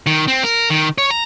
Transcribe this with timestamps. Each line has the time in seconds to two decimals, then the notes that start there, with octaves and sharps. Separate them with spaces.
0.07 D#3
0.28 C4
0.44 A#4
0.70 D#3
0.98 C#5
1.10 A#5